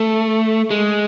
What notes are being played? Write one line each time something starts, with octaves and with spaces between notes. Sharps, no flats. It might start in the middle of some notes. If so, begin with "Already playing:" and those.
Already playing: A3
G#3